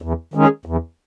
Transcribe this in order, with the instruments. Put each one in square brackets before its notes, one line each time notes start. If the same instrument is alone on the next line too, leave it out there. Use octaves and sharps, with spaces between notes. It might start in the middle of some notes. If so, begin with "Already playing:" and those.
[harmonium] E2
D#3 G#3 C#4 G#4
E2